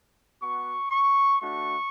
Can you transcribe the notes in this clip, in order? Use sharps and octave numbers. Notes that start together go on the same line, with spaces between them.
B3 F#4 C#6
C#6
A3 D4 F#4 C#6